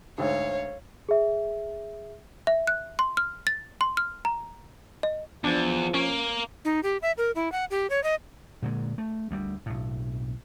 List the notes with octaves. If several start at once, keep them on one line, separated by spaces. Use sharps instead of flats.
D2 G#2 C#5 F5
G#4 E5
E5
F#6
C6
F6
A6
C6
F6
A#5
D#5
E2 F3 D4
A#3 C#4
D#4
G4
E5
A#4
E4
F#5
G4
C#5
D#5
A#2 D3 D#3 G#3
A3
D2 G3
B1 A2